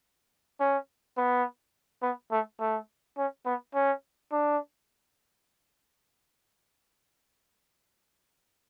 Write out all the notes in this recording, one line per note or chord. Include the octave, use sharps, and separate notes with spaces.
C#4
B3
B3
A3
A3
C#4
B3
C#4
D4